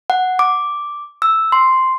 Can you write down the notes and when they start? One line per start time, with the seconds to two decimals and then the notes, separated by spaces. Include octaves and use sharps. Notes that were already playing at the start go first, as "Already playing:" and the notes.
0.10 F#5
0.39 D6
1.22 E6
1.52 C6